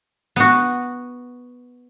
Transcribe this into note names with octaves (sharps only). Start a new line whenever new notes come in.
B3 F#4